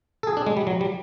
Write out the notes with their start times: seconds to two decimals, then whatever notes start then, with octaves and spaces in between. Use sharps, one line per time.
0.23 A4
0.27 G#4
0.37 D4
0.47 G#3
0.57 G3
0.67 F#3
0.81 G3